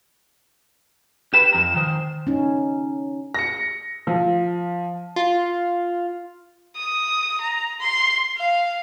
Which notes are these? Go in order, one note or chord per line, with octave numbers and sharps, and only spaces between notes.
G4 B4 E7
F2 A#5
D#3 C5
C#4 D#4
A#6 C#7
F3
F4
D#6
A#5
C6
F5